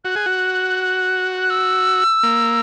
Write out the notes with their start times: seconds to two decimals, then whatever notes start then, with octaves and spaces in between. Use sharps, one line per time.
0.05 F#4 F#6
0.16 G#4
0.26 F#4
1.37 F#6
1.50 E6
2.23 A#3